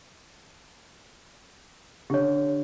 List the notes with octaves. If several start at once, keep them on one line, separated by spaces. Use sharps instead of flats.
D3 G4 C#5